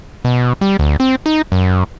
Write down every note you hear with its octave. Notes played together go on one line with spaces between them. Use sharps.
B2
G3
D2
C4
D#4
F#2